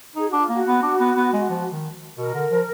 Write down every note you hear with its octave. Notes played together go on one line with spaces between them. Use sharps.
D#4 G#4
D4 F#4
F4
A#3 F#4
B3
D4
B3
B3
G#3
F3
D#3
B2 A#4
D3
F3